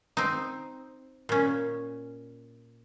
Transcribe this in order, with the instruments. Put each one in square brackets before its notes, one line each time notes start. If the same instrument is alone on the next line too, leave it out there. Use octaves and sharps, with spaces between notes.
[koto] C4 D#4
A#2 C#4